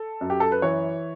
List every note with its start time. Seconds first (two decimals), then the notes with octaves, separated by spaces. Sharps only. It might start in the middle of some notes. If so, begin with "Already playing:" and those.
Already playing: A4
0.21 F#2
0.30 G4
0.40 A4
0.52 B4
0.62 E3 C#5